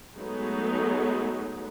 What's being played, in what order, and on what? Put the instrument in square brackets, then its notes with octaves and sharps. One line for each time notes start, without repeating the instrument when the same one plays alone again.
[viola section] F#3 G#3 A3 B3 D#4